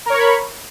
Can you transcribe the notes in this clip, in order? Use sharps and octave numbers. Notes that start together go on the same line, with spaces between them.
A#4 C#5 B5 C#6